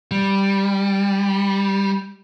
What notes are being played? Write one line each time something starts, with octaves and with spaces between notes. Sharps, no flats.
G3